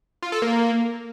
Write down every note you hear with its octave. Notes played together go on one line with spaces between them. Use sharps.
F4
A4
A#3